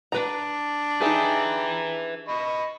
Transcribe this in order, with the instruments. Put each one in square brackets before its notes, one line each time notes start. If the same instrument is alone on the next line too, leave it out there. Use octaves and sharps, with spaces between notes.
[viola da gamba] D4 [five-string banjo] B4 A#5
[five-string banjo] D#4 G4 G#4 [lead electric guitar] B4 E5 [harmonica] G5 A#5
[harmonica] D#5 B5 C#6